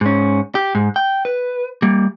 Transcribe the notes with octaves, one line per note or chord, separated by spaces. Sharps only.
G#2 C#4
G4
G#2
G5
B4
G3 A#3